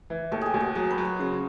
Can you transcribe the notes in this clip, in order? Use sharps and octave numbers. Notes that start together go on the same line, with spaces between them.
E3
D#2 A4
G4 G#4
D#2
F#4
F#3 G#4
B4
F#3
C#5
C#3 C5